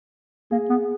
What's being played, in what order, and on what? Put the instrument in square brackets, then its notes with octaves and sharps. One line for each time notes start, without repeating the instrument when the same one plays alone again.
[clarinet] A#3 [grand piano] G#4
[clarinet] B3